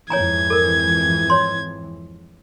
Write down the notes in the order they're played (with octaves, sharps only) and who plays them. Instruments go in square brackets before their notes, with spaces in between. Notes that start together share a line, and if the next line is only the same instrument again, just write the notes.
[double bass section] F2 G#2 E3 [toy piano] C#5 G#5 A#5 [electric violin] G#6
[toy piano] A4 A#4
C#5 C6